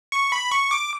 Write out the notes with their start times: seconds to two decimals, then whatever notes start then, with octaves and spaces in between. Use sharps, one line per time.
0.12 C#6
0.32 B5
0.52 C#6
0.71 D6